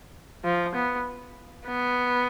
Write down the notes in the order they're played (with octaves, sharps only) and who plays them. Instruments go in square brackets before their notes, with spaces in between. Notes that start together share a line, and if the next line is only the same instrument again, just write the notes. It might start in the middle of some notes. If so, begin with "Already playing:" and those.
[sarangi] F3
B3
B3